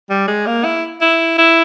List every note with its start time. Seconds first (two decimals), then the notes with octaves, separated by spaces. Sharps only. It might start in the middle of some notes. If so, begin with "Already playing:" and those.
0.10 G3
0.27 G#3
0.47 A#3
0.64 E4
1.01 E4
1.38 E4